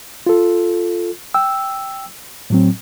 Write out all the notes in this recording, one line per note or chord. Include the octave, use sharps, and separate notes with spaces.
F4 A4
G5 E6
A2 F#3 C4